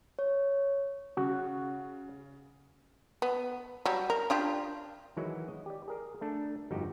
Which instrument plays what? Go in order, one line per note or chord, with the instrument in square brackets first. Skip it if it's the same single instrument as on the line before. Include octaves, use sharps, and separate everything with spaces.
[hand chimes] C#5
[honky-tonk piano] C#3 [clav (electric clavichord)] F#4
[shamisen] B3
F#3 G3
A#4
D4 F4 G4
[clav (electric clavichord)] D#3 E3 F#3 G#3 E4 F#4
D#5
G4 D5
G#4 A#4
A3 D4 A4
G1 F2 D#4 F#4 G4